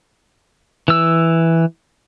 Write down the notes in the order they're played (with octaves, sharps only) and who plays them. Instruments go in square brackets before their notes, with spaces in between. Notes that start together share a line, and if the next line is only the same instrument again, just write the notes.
[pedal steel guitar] E3 E6